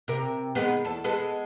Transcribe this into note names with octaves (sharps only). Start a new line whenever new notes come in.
C3 A#4
D#3 G#3 B3
E2 A4
G#3 B3 A4